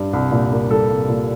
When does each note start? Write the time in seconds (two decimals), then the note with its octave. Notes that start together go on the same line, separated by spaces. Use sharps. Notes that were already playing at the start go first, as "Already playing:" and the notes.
Already playing: G2
0.13 C2
0.32 A#2
0.52 A#3
0.70 G3 A4
0.90 C2
1.09 A#2